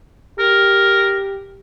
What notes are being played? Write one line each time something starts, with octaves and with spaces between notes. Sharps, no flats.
G4 A#4